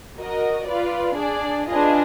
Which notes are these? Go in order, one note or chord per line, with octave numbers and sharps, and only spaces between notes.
F#4 A#4 D#5
F4 B4 D5
D4 G#4 D5
D4 F4 G#4 B4 D#5